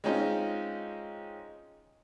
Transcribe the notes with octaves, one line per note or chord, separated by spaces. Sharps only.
G#3 C4 C#4 D#4 F4